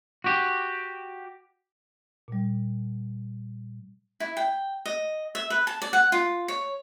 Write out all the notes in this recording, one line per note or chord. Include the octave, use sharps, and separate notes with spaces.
F#4 G4
A#2 G3
E4
G5
D#5
E5
B4
A5
D5
F#5
F4
C#5